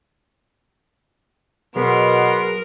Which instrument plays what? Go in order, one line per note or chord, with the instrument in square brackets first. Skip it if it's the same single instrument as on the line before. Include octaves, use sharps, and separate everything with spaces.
[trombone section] B2 [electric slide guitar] F#3 G#4 B4 [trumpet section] B3 C6 [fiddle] A#4